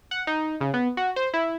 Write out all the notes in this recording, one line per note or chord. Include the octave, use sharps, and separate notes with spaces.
F#5
D#4
C#3
B3
F#4
C5
E4